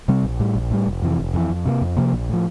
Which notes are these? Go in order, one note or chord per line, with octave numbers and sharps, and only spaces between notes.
C3 G3 C4
A#1
A2 G3
A#1
A2 G3
F1
F2 C3 E3
F1
F2 C3 E3
F2
C3 F3 A#3
F2
C3 F3 A#3
A#1
A2 F3